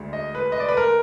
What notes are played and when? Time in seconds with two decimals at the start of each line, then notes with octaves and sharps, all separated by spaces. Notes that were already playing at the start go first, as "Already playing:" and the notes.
Already playing: D2 D3 G#3
0.13 D#5
0.35 B4
0.52 D#5
0.60 D5
0.69 B4
0.77 A#4